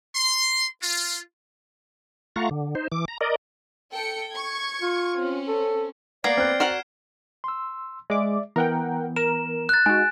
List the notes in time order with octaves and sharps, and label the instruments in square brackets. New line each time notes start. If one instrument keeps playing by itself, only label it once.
[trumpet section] C6
F4
[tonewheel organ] A3 F4 F5 F#5 A#5 C#6
D3
D#4 C5
E3 D6
A#5
A#4 D5 D#5
[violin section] A4 G5 C#7
C#6 G#6
[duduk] F4
[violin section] C4 C#4
[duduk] A4
[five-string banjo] A#3 B3 A#5 [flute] D5 [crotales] G#6 C7 D7
[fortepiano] C4 F#6 [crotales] F6
[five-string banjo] F#4 A#4 F#5 [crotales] E7
[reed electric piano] C6 E6
[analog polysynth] G#3 D6 [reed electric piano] D5 E5
[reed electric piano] E3 B3 [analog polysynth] A#4 F#5 G5
[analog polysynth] A#4 [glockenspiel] E7
[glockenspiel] F#6 A6
[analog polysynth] G#3 F#4 [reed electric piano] D#4 [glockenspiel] G#5